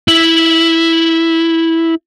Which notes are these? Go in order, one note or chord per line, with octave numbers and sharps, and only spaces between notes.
E4